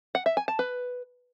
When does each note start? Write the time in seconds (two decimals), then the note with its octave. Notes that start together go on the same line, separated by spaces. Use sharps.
0.15 F#5
0.26 E5
0.37 G#5
0.48 A5
0.59 B4